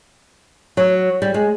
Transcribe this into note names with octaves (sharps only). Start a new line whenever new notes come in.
F#3
G3
G#3